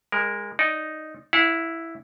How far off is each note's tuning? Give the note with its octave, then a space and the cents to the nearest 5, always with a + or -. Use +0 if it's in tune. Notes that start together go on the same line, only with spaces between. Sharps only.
G#3 -20 A#4 +0
D#4 +0 D5 +0
E4 +0 F#5 -45